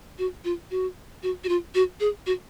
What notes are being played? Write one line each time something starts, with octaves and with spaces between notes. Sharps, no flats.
F#4
F4
F#4
F#4
F#4
F4
F#4
G#4
F#4